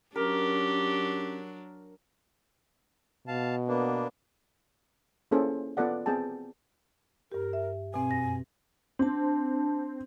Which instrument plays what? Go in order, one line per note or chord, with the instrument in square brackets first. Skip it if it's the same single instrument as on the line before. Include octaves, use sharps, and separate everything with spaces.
[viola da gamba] F#3 D4 [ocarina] C#4 [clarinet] G4 [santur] A#4
[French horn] B2 [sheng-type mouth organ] F5 A5
[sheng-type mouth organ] A#3 B3 D4
[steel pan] A#3 C#4 E4 G#4 A4 C5
B3 F4 A4 D5 F#5
B3 C4 G#4 G5 A5
[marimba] G2 G4 [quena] A#4
[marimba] E5
[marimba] B2 C4 [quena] G#5
[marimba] F#2 A#6
[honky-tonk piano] C4 [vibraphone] D4 A5